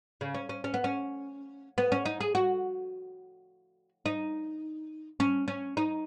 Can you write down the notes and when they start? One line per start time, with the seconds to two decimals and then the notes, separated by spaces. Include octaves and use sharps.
0.21 C#3
0.34 C#4
0.49 C#4
0.64 C#4
0.74 B3
0.84 C#4
1.78 B3
1.92 C#4
2.06 D#4
2.20 G#4
2.35 F#4
4.06 D#4
5.20 C#4
5.48 C#4
5.77 D#4